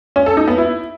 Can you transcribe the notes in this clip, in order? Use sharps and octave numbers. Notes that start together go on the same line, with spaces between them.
C#4
A4
D#4
B3
E4